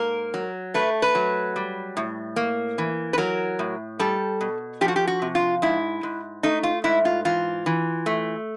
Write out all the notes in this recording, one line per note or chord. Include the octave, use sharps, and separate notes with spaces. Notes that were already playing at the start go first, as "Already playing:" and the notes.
Already playing: G#2 A#3 A#4
F#3
A3 B4
B4
F#3
G3
A2
A#3
E3
B4
F#3 A#4
A2
G3 A4
B2
F3 G4
F#4
G4
F#4
C3
F4
G#2 E4
G#2
A3 D#4
F4
G#2 E4
F4
E3 F4
E3
A3